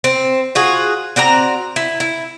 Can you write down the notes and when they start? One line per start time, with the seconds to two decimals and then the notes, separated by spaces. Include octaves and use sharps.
0.04 C4
0.55 F4 F#4 G#4
1.16 C4 F#4 D5 A#5
1.76 E4
2.00 E4